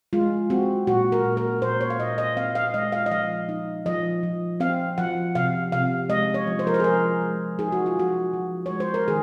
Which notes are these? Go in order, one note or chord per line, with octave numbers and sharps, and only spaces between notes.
G#3 F4
C4 F#4
A#2 F#4
A#4
A#2
A#4
A#2 C5
C#5
F5
A#2 D#5
D#5
C4 F5
F5
G#3 D#5
F5
D#5
F3 F5
D#4
F3 D#5
F3
C4 F5
F3 F#5
C3 F5
C3 F5
G#3 D#5
C#5
F3
C5
A#4
C5
G#4
F3 A#4
G#3
D#4 G#4
F#4
F4
F3 F#4
F3
G#3 C#5
C5
A#4
D#3 G#4